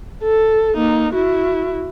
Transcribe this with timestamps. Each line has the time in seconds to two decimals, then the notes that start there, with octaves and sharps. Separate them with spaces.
0.23 A4
0.75 A#3 D#4
1.14 E4 F#4